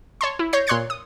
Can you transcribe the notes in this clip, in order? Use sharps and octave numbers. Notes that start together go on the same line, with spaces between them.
C#5 A5 C6
E4
C#5 G6 A#6 C7
A#2 C#5 C6 F#6 G#6 C#7
D#6